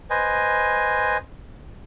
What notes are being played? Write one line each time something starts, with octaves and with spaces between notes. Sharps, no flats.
B4 C5 D#5 G#5